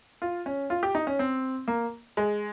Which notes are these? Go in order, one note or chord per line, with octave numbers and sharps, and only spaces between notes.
F4
C#4
F4
G4
D#4
C#4
C4
A#3
G#3